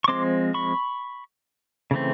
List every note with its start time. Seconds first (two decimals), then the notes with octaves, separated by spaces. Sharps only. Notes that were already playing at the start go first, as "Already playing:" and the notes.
0.04 C#6
0.08 F3 G#3 C4 C6 D6
0.54 B5 C#6
1.91 C#3 E3 A3 C4